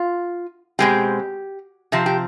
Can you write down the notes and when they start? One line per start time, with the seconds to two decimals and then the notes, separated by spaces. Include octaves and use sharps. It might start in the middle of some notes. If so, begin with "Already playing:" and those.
Already playing: F4
0.79 B2 G#3 C4 G4
1.92 C3 F3 C4 G4
2.06 G4